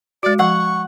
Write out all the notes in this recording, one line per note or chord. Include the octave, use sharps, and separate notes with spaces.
G#3 F#4 D5
F3 F#5 C#6